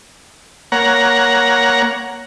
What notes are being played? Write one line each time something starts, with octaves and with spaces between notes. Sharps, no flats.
A#3 C#5 F#5 A#5